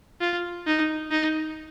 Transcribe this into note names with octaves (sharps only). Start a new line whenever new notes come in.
F4
D#4
D#4